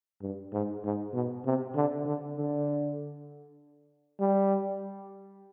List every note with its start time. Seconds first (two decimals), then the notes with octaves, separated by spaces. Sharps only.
0.22 G2
0.52 G#2
0.84 G#2
1.14 B2
1.45 C3
1.75 D3
2.06 D3
2.37 D3
4.20 G3